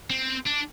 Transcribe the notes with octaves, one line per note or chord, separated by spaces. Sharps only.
C4
D4